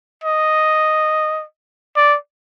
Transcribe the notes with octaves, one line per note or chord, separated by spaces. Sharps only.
D#5
D5